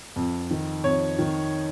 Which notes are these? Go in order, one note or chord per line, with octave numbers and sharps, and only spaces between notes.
F2
D#3
F2 C#5
D#3